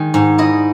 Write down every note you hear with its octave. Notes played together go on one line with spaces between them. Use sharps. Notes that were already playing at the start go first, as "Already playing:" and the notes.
Already playing: D#3 G#3
G#2
E4 D#5